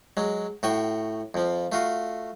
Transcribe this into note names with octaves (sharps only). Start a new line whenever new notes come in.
F#3 G#3
A2 F#4 G5 C#6
F2 F3
A3 F4 F#4